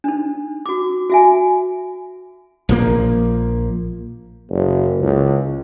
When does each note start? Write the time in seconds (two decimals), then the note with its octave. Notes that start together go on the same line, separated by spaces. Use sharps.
0.04 D4 D#4
0.66 F#4 D6
1.10 F#4 E5 G#5
2.69 A#1 F3 A#3
4.51 F#1
5.01 C#2